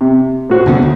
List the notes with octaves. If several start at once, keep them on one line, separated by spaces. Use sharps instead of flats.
C3
A2 F#4 C5
F1 D3 B3
D2